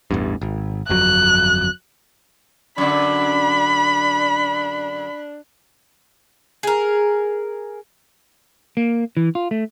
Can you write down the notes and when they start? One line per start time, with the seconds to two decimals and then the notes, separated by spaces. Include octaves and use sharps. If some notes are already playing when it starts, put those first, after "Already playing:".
0.11 A1 E2 G2
0.41 G#1
0.89 G1 F2 F#3 F#6
2.78 F#2 D3 D4 B5
6.63 G#4 A#4
8.77 A#3
9.17 E3
9.35 F4
9.51 A3